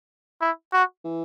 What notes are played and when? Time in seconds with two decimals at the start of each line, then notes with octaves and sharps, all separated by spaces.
0.41 E4
0.73 F#4
1.05 E3